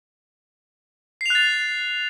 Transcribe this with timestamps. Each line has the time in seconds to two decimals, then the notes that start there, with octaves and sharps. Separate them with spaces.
1.21 C7
1.26 F7
1.30 F#6
1.35 A6